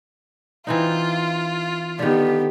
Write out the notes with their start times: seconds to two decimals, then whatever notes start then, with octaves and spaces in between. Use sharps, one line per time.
0.67 E3 C4 D#4 F4
1.99 D3 D#3 B3 G4